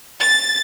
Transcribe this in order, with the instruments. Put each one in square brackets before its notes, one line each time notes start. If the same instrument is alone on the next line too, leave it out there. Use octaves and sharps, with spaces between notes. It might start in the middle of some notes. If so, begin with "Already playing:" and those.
[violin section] A6